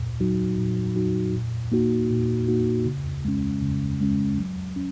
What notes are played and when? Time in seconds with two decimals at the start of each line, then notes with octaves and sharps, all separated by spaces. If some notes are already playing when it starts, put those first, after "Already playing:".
Already playing: A#2
0.20 F#3 D#4 F#4
0.58 A#2
0.96 F#3 D#4 F#4
1.34 A#2
1.72 A#3 D#4 F#4
2.11 A#2
2.48 A#3 D#4 F#4
2.85 C#3
3.25 G#3 C#4
3.62 C#3
4.01 G#3 C#4
4.38 F#3
4.76 C#4